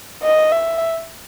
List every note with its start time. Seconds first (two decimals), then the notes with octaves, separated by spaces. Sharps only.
0.23 D#5
0.52 E5